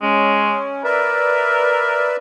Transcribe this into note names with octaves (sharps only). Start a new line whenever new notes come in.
G#3 C#4
A#4 B4 D5 E5